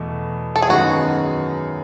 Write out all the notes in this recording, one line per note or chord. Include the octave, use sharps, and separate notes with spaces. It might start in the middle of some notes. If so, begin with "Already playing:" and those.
Already playing: E2 B2 A3
A4
G#4
F#2 D#3 G#3 B3 D#4 F#4